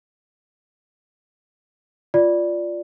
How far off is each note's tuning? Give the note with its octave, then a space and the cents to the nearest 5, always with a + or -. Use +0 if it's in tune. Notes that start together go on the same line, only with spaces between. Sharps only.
F4 +0 D5 +0